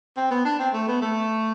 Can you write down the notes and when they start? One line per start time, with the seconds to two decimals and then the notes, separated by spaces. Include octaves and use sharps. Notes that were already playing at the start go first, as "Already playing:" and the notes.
0.17 C4
0.31 B3
0.45 D4
0.59 C4
0.74 A3
0.88 B3
1.02 A3